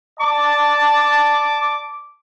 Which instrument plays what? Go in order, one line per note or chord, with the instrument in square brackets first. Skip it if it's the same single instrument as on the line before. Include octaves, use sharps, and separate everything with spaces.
[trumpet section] D5 A5 [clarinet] D6